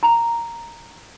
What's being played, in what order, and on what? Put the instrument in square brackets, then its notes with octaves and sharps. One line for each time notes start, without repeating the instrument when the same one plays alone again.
[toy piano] A#5